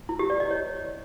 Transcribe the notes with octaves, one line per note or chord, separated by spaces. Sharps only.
E4
G4
D5
D#5
C#5